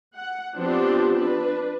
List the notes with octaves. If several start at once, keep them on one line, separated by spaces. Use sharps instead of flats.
F#5
F3 B3 C4 D4 G4
D4 B4